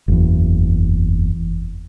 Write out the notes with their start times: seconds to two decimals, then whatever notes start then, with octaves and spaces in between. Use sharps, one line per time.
0.08 F#1 E2